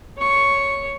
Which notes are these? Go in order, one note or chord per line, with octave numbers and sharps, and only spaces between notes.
C#5 C#6